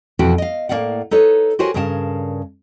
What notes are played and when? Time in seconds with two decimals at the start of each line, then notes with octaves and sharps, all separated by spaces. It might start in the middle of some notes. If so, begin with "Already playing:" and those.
0.19 F2 B2 E3 F#4 G5
0.38 D#5 F5
0.69 A2 A#3 C#4 D5 F5 F#5
1.11 D#4 A4 B4 C#5
1.59 F#4 G4 A#4 C5 C#5 G#5
1.74 G2 C#3 A#4 G5 A5